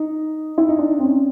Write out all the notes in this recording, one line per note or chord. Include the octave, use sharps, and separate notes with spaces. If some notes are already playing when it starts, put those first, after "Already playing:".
Already playing: D#4
E4
D#4
D4
C4
C#4